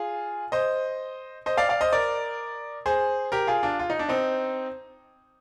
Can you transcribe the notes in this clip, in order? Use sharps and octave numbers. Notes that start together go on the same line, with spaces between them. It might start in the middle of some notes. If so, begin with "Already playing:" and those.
Already playing: F4 G#4
C5 D#5
C5 D#5
D5 F5
D5 F5
C5 D#5
A#4 D5
G#4 C5
G4 A#4
F4 G#4
D4 F4
F4
D#4
D4
C4 D#4